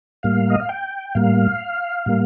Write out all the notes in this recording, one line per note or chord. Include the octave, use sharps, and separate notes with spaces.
A2 G3 A#3 F5
D#5
F5
G5
A2 G3 A#3 F5
A2 G3 A#3